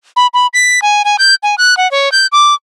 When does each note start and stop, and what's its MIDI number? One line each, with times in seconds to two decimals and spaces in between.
0.16 0.27 83
0.34 0.47 83
0.53 0.80 95
0.82 1.02 80
1.05 1.17 80
1.19 1.35 91
1.43 1.55 80
1.58 1.77 90
1.77 1.90 78
1.91 2.12 73
2.12 2.27 91
2.32 2.54 86